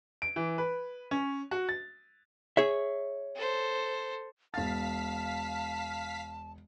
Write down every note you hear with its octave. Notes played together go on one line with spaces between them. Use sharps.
D7
E3
B4
C#4
F#4
A6
G#4 C#5 E5
A4 C5
E1 F5 A5 A6 B6